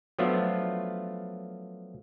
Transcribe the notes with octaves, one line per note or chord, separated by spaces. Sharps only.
F3 F#3 A3 B3 D4 F4